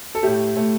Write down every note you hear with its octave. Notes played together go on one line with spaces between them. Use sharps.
A4
A2 A3 G4
A2 A3